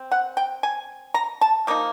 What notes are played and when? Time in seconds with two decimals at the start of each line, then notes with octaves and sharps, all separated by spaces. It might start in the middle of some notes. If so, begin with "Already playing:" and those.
Already playing: C4
0.12 F#5
0.37 G5
0.63 G#5
1.14 A#5
1.41 A5
1.67 F3 A#3 D#4